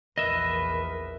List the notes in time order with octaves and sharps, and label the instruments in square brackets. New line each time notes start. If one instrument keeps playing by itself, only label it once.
[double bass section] A#1 E2 [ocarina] A#4 [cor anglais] B4 [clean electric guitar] D#5 E5